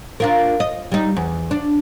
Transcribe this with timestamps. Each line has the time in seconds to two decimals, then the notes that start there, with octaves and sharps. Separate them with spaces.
0.20 D4 F4 A#4
0.60 D#5
0.92 G3 D#4
1.16 E2
1.51 D4